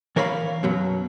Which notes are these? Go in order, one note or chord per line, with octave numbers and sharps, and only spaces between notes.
E3 A#4 C#5 F5 B5
F#2 B2 F#3